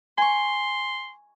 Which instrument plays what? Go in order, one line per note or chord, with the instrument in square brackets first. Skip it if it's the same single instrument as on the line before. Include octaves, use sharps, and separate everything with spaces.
[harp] G#5 C#6 [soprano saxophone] C6